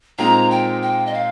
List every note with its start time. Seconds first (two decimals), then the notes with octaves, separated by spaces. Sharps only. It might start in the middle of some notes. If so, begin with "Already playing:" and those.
0.18 A#2 G#3 C4 D#4 A#5
0.50 G5
0.82 G5
1.06 D#5
1.14 F5